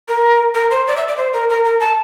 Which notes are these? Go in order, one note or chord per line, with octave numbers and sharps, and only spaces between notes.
A#4
A#4
C5
D5
E5
D5
C5
A#4
A#4
A#4
A5